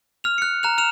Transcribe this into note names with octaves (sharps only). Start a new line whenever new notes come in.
F6 F7
F#6 C#7
A#5 F#6 F7
F6 E7 F7